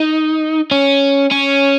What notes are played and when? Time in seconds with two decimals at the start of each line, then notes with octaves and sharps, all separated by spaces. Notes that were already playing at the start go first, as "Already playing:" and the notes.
Already playing: D#4
0.71 C#4
1.32 C#4